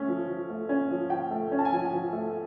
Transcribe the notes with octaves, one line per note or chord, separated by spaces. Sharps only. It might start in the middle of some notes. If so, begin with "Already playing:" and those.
Already playing: A3 C#4
F3
F3
A3
C#4
F3
F3 G5
A3
C#4
A5
G#5
F3
F3
A3